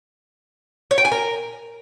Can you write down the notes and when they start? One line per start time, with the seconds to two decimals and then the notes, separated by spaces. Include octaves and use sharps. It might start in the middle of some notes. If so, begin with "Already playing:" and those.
0.91 C#5
0.98 G5
1.05 G#5
1.12 A#4